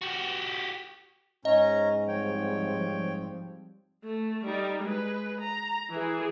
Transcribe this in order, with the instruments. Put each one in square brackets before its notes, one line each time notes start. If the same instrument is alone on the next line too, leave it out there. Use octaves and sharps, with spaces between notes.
[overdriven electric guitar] F#4 G4
[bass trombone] G#2 [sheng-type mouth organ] C#4 A#5 [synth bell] D#5
[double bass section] F3 G3 C4 [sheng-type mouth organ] C#5 G5
[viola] A3
G3 D#4
G#3 B4
A#5
E3 G#4